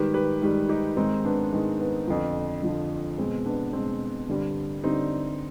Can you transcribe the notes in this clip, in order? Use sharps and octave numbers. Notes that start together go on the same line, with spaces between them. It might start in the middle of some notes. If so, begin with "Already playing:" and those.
Already playing: G#2 D#3 G3 G4 B4
G4 B4
G#2 D#3 G3
D#4 G4
G#2 D#3 G#3 C4 D#4
B3 D4
G#2 D#3 G#3 B3
B3
F2 D3 F3
F2 D3 F3
B2 G#3 C4
B3 D4
B2 G#3 C4
G2 D3 G3
G2 D3 G3 C4 D#4